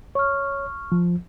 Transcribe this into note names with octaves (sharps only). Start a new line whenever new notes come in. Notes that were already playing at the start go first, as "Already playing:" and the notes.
C#5 C#6 F6
F3